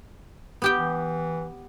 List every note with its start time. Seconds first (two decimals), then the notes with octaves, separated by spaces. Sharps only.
0.62 B3 G4 G5
0.78 E3